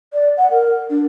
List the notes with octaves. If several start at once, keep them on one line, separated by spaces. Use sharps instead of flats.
D5
F#5
A#4
D4